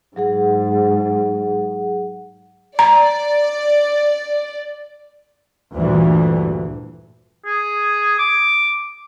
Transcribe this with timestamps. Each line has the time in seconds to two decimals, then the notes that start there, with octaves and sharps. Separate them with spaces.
0.16 G#2 F#3 G#4 F#5
2.79 D5 A#5
5.74 D2 G2 A#2 D3 E3
7.46 G#4
8.19 D6